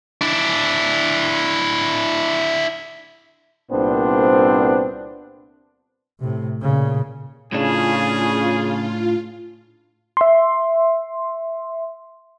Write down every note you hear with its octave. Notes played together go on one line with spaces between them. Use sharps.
D4 E4
C2 A#2 B3 C4 D4 C5
A2 C3
A#2 C#3
A2 C#3 D4 F4 G#4
E5 C6